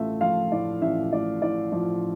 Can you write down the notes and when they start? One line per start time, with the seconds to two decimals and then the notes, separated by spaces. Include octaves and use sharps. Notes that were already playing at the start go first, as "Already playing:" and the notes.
Already playing: A1 A3 F4 E5
0.21 F3 F4 F5
0.52 A2 D5
0.81 A1 E5
1.12 A2 D5
1.42 A2 D5
1.72 F3 D5